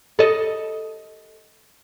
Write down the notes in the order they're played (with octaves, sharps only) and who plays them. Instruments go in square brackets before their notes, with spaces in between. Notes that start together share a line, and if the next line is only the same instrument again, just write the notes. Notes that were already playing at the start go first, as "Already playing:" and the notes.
[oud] A4 D#5